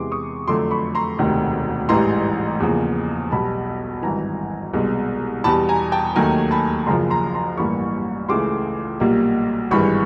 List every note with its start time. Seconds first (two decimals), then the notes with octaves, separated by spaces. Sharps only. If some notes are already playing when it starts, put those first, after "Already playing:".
Already playing: E2 C3 E3 G#3 C6 D6
0.12 C#6 D#6
0.48 F2 D3 F#3 A3 C6 D6
0.71 B5 C#6
0.95 A#5 C6
1.19 E1 D2 C3 D#3
1.89 A1 G#2 E3 G3 A#5 C6
2.60 E2 C#3 F3 A#3
3.31 B1 B2 G3 A5 B5
4.03 G#1 G2 E3 G#5 A#5
4.74 C2 B2 G#3
5.44 E2 B2 G3 A5 B5
5.69 G#5 A#5
5.92 G5 A5
6.15 D#2 D#3 F#3 A3 G#5 A#5
6.51 A5 B5
6.86 F#1 F#2 C#3 F3 A#5 C6
7.10 A#5 C6
7.34 A#5 C6
7.57 A1 G2 E3 G3 A#3 B5 C#6
8.29 C#2 C#3 E3 A3 C6 D6
9.00 B1 A#2 G3 A#3
9.71 G#1 G2 E3 G#3 B5 C#6